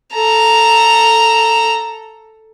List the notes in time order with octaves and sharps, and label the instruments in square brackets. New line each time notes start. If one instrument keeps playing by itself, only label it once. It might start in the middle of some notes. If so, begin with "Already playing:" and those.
[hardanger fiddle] A4 A#5